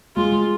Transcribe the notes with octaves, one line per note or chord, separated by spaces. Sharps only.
G#3 F4